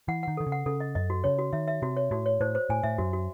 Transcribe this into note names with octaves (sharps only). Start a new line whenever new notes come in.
E3 F#5
D#3 F#5
D#3 A4
C#3
F#5
C#3 A4
D#5
F#2 D#5
F#4
C#3 C#5
F#4
D#3 E5
E5
C3 F#4
C#5
A2 F#4
C#5
A2 C5
C5
A2 G#5
A2 E5
F#2 F#4
F#4